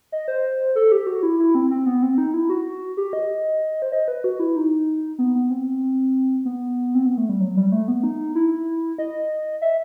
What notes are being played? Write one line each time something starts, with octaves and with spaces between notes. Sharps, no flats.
D#5
C5
A4
G4
F#4
E4
E4
C4
C4
B3
C4
D#4
E4
F#4
G4
D#5
C5
D#5
B4
F#4
E4
D#4
B3
B3
C4
B3
C4
B3
A3
G3
F#3
G3
A3
B3
D#4
E4
D#5
E5